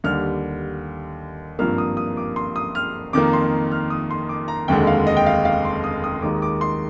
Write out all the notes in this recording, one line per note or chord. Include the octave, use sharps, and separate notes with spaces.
D#2 D3 G3 F6
G#1 G2 F3 A#3 F6
D#6
D#6
D6
C6
D#6
F6
F2 D#3 A#3 D6
C6
F6
D#6
C6
D6
A#5
F1 D#2 D3 G#3 G5
F5
D#5
G5
F5
F5
C6
D#6
D#6
D#2 D#3 G#3 D6
D6
C6